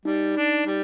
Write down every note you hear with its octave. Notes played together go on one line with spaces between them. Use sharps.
G3 D#4
D4
G3